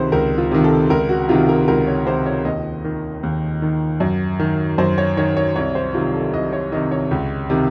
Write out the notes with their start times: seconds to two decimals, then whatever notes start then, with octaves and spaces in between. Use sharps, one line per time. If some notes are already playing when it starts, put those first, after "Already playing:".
Already playing: C#2 C3 D#3 C5
0.12 C#2 A#4
0.38 F4
0.51 C3 D#3
0.64 A4
0.90 C#2 A#4
1.09 F#4
1.29 C3 D#3 F4
1.49 A#4
1.68 C#2 A#4
1.87 C#5
2.06 C3 D#3 C5
2.26 C#5
2.45 D#2 D#5
2.84 D#3
3.23 D#2
3.62 D#3
4.00 F#2
4.40 D#3
4.78 F#2 C5
4.98 C#5
5.17 D#3 C#5
5.37 C#5
5.56 C2 C#5
5.75 C5
5.94 C3 D#3 F4
6.14 A4
6.33 C2 D#5
6.53 C#5
6.72 C3 D#3 D#5
6.91 C#5
7.11 C#2
7.50 C3 D#3